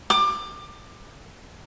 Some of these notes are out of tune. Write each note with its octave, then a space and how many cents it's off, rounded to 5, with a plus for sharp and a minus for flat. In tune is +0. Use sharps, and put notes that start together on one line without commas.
D6 +25